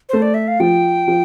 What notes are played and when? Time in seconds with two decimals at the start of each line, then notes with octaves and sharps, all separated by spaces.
0.09 A3 C5
0.22 D5
0.34 E5
0.48 F5
0.60 F3 G5
1.08 F3